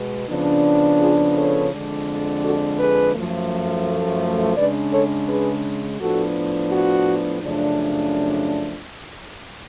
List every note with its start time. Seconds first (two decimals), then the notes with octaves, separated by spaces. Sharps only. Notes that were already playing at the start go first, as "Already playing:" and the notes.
Already playing: B2 G#3 B3
0.28 C#3 F3 B3 D4
1.00 F4 G#4
1.35 A4 C#5
1.71 F2 D3 G#3 D4
2.43 F#4 A4
2.78 G#4 B4
3.15 F#2 F3 A3
4.57 C#3 G#3 D4 B4 D5
4.92 A4 C#5
5.29 G#4 B4
6.00 A2 F3 B3 D4 F#4 A4
6.72 F#4
7.43 F#2 C#3 F3 A3 D4